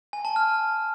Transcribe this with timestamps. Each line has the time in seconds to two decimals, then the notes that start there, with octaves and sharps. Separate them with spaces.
0.13 G#5
0.25 A5
0.36 F6